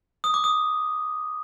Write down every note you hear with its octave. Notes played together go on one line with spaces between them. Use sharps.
D#6
D6
D#6